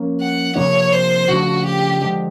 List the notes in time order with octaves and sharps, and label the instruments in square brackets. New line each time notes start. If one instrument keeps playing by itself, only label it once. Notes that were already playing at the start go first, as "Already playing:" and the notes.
Already playing: [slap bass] F3 A#3 C#4
[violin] F#5
[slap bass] C3 F3 A#3 D4 [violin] C#5
[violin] C5
[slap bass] C#3 F3 A3 D4 [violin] F#4
[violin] G4
[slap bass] D3 F3 G#3